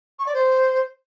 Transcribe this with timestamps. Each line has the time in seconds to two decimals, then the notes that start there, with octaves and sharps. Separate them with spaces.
0.19 C#6
0.26 D5
0.34 C5